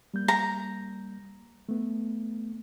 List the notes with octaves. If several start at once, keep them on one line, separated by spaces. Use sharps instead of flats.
G3 A#3 G6
A#5
A3 B3